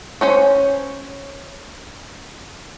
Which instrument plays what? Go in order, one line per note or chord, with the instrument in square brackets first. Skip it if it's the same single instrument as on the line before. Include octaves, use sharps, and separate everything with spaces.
[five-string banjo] C#4 C5 C#5